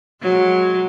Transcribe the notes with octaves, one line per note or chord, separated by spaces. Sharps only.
F#3 G#3